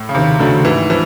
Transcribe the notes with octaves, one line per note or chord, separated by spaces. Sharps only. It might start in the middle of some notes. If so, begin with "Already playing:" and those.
Already playing: A2
C#3
D#2 C3
C#3 F#3 A3 D4
G#2 E3
E3 F3